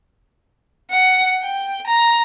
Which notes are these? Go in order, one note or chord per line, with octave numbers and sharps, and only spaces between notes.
F#5
G5
A#5